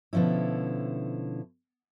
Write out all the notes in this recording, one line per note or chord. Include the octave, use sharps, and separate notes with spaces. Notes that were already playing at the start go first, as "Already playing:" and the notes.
B2 D3 F3 C#4 E4